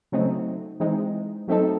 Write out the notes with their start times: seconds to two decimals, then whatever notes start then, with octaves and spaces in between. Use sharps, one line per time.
0.12 C#3 F#3 A3 C4 D#4
0.80 E3 G#3 C4 D#4
1.48 F#3 A3 C4 D#4 A4